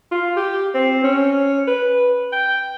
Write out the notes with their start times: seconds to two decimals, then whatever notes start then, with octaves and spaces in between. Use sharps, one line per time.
0.12 F4
0.37 G4
0.74 C4
1.04 C#4
1.67 B4
2.33 G5